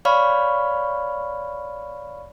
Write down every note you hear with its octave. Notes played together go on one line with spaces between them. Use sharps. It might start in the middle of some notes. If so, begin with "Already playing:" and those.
C#5 D5 F5 B5 C#6 F6